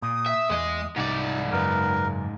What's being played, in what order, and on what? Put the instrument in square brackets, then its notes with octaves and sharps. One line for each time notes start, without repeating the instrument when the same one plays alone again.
[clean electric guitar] A#2 [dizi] D#6
[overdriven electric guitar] E5
[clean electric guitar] E2 [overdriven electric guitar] G#3 D#5
[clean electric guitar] C2 [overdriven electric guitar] G#2 D5 [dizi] D#4
[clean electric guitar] F#2 C#3 [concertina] A#4 [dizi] B4